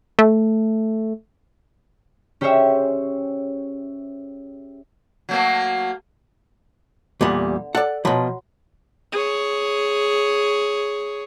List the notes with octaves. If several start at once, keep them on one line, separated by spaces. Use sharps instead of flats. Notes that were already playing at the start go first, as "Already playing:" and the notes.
A3
C#4 G4 G#4 C5 C#5 E5
F#3 A3 A#3
E2 A#2 D3 G3 B3
A4 D5 F#5
B2 F3 F#3 B5 C6
G#4 C#5